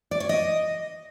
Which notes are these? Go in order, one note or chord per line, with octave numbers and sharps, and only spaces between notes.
D5
C#5
D#5